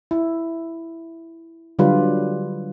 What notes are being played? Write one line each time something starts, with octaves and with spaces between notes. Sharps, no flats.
E4
D3 F#3 G3 F4 G4 B4